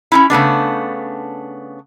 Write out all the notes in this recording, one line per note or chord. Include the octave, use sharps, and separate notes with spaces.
C#4 D#4 E4
C#3 A3 B3 D4